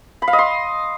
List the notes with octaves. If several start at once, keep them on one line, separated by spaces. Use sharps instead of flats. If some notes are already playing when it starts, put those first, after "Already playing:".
B5
F5
D#5
C6